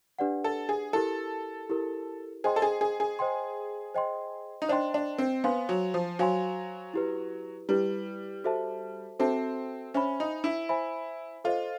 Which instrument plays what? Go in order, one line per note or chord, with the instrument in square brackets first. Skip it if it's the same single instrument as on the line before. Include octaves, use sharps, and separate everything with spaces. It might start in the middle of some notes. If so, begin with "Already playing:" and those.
[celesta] D4 G4 B4 D5 F#5
[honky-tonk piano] A4
G#4
[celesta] E4 G4 A#4 [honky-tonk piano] A4
[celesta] E4 G4 A#4
[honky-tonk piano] G#4 [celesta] C5 D#5 G5 C6
[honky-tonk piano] A4
G#4
G#4
G#4
[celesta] C5 D#5 G5 C6
C5 D#5 G5 C6
[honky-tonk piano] D#4
[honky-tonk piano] D4 [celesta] C5 D#5 G5 C6
[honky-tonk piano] D4
C4
[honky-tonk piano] B3 [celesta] C5 F5 G#5 C6
[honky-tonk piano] F#3
F3
[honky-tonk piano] F#3 [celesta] C5 F5 G#5 C6
[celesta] E4 G4 B4
[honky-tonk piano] G3 [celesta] E4 G4 B4
[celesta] F#4 A4 C5 E5 A5
[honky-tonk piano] C4 [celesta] F#4 A4 C5 E5 A5
[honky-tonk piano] C#4 [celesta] C5 E5 G#5 B5
[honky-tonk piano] D#4
E4
[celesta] C5 E5 G#5 B5
[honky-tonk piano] F4 [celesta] A4 C5 D#5